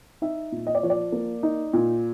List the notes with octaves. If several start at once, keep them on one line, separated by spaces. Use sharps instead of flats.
D#4 E5
A#2
D#5
D5
F3 C#5
D5
A#3
D#4
A#2